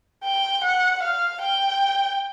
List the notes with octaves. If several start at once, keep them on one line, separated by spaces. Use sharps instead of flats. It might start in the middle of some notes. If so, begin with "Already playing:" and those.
G5
F#5
F5
G5